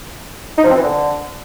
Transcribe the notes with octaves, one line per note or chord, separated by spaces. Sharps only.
D#4
F3
C4
E3
D3